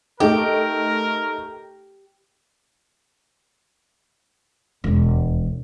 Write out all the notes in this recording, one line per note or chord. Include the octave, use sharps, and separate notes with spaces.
A3 D#4 G4 A4 A#4
E1 D#2